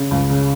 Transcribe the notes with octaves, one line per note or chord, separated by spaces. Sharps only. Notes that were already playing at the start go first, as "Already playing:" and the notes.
Already playing: C#3
C#2
C#3